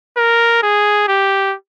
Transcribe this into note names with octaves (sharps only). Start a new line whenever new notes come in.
A#4
G#4
G4